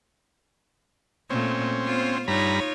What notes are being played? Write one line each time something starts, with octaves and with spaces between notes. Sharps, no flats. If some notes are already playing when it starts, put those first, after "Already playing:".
A#2 A3 C4 C#4
B3 F4 C5
G2 D#4 F4 C#5 A#5 B5